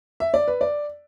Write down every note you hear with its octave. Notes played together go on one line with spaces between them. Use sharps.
E5
D5
B4
D5